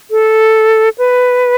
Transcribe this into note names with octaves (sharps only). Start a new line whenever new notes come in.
A4
B4